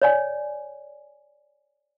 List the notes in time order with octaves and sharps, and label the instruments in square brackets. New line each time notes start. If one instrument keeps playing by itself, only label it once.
[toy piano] C#5 D5 G#5